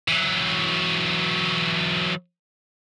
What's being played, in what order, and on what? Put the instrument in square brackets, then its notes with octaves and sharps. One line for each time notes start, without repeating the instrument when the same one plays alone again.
[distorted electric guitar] E3 F#3